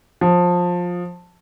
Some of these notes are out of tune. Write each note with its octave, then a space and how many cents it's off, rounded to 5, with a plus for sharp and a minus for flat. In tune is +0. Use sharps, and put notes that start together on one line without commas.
F3 +20